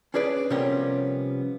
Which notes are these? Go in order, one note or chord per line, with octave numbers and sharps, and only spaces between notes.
C#4 D4 G#4 B4 D5
C3 F3 G3 B3 C#4 A#4